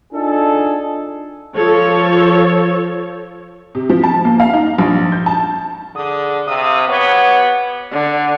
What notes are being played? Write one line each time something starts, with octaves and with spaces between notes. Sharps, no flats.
D4 D#4 F4 G#4 A4
F3 A4 C#5
C3
F3
A5
A#3
F5
D#4
A#1
G6
A5
D3 G#4 D#6
C3 F5 D#6 E6
B3 G4 C#5
D3